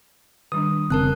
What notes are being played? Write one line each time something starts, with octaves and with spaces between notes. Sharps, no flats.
D#3 G3 D4 D#6
F1 C#3 C4 A#4 A5 F#6